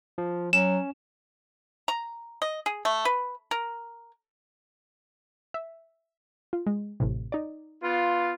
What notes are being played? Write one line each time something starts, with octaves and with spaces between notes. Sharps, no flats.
F3
F#3 C#4 E7
A#5
D#5
G#4
A3
B4
A#4
E5
F4
G#3
A1 A2 C3
D#4 D5
B3 F4